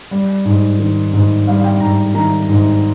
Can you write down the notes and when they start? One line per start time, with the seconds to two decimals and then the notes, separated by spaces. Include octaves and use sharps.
0.11 G3
0.45 G#2
0.79 D#3
1.13 G#2
1.47 G3 F5
1.64 G5
1.80 G#2 A#5
2.14 D#3 A#5
2.49 G#2